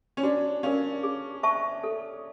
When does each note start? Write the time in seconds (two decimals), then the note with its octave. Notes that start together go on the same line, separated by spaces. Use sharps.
0.17 C#4
0.23 D4 F#4
0.63 C#4 A#4 D5 F5
1.03 G#4
1.43 C5 E5 A5 C#6
1.84 A4